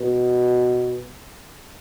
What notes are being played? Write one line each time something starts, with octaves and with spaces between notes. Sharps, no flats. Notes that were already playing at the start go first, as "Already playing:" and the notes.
Already playing: B2